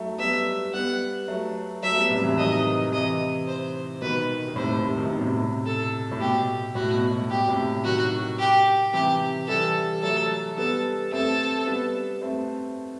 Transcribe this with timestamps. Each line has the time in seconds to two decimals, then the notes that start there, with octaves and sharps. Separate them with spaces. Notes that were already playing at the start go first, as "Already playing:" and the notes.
Already playing: F#3 A3
0.18 G3 B3 E5
0.73 G3 B3 F#5
1.28 F#3 A3
1.83 F#3 A3 E5
1.96 G3 B3
2.10 A2 C3
2.24 C3 E3
2.38 D#3 F#3 D#5
2.92 C3 E3 D#5
3.47 C5
4.02 B2 D#3 B4
4.48 D#3
4.56 A2 C3 C5
4.70 A2
4.84 A2 C3
4.98 D#3
5.05 C3
5.14 B2
5.21 A2 C3
5.66 A4
6.12 A2
6.20 B2 G4
6.75 A2 F#4
6.94 B2
7.11 A2
7.30 B2 G4
7.48 A2 C3
7.84 D#3 F#3 F#4
8.39 G4
8.93 C3 E3 G4
9.48 E3 G3 A4
10.03 F#3 A3 A4
10.57 G3 B3 A4
11.12 A3 C4 A4
11.67 G3 B3
12.21 A3 C4